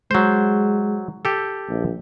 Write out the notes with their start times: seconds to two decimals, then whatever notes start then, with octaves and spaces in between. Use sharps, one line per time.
0.11 F#3 G#3 C5
1.25 G4 A4
1.69 A#1